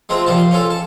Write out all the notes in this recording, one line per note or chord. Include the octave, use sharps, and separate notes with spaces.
G#3 A3 C4 F4
A#1 C3 F4 A5
C6
C#4 F4 A4
A5